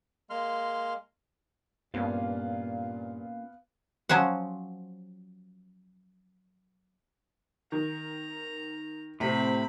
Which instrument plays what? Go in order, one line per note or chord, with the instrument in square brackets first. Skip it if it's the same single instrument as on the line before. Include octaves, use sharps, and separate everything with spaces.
[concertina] G#3 A#3 C6 F6
[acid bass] G2 [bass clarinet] A#2 [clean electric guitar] A#3 C#4 F4 [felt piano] B3 F5
[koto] F3 F#3 C#4 C5 F#5
[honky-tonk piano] D#3 [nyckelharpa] A#5
[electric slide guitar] A2 [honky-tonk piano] C3 [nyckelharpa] C4 B5